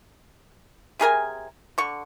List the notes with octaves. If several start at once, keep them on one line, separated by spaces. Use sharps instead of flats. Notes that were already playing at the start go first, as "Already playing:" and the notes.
C3 G#4 A#4 G#5
D3 C#6